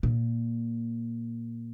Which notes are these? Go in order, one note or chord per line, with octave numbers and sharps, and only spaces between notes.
A#2